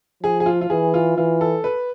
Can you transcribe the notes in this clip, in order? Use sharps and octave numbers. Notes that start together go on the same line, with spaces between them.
F3 G#4
G#4
F4
F4
E3 G#4
F4
E3 F4
A4
B4